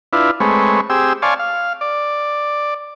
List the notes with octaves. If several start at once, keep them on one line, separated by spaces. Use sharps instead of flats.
D4 E4 F4 B4
G#3 A3 C4 B4 C#5
C4 G4 G#4 E6
C#5 D5 F5 G#5 A5 C6
F5
D5